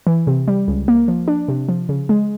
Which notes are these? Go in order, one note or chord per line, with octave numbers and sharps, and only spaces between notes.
E3
C3
G3
C#2
A#3
F3
D4
C3
F3
C#3
G#3